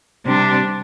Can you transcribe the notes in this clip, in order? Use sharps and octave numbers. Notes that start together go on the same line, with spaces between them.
C3 G3 D4